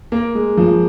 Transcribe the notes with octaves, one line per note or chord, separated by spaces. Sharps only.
A#3
G#3
F3